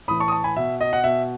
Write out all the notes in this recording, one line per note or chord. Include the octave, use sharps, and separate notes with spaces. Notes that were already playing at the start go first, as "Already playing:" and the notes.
A2 E3 B5 D#6
A5 C#6
D#6
A5 C#6
G#5 B5
B2 E5
D#5
F#5
B2 E5